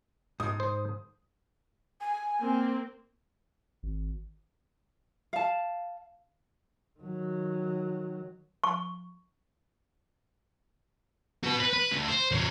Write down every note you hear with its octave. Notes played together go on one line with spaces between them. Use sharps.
G#2 D#6
C5
G#5
A#3 C4
G#1
F5 A5
D#3 F#3
C#6
F#4 B4
B4
B4
D2
C5
E2 C#4